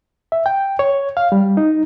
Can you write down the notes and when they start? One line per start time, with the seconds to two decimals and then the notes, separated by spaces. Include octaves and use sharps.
0.32 E5
0.46 G5
0.79 C#5
1.17 F5
1.32 G3
1.57 D#4